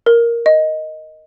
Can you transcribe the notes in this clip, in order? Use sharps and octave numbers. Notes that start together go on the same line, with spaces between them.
A#4
D#5